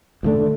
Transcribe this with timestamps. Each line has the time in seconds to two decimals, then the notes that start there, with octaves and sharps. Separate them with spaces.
0.23 D2
0.26 D3 A3 D4